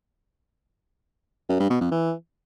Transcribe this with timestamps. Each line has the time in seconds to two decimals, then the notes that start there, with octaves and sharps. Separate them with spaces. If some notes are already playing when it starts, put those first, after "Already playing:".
1.49 F#2
1.60 G2
1.70 B2
1.81 F2
1.91 E3